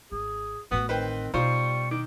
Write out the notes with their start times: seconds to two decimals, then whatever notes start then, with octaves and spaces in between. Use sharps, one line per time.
0.12 G#1 G#4
0.71 A1 A2 B3 F#4
0.89 D#3 C4 B4 C5 G5
1.34 B2 G3 D#4 F4 C5 C#6
1.91 D#3 D6